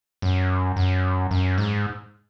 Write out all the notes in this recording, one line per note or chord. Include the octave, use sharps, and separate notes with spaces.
F#2
F#2
F#2
G#2